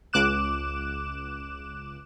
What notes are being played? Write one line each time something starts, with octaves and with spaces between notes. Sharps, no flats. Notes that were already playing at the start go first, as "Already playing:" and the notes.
C#2 D6 F#6 E7